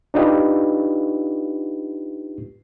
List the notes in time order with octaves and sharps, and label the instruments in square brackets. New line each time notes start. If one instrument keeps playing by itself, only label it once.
[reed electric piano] D4 D#4 F4 G4 B4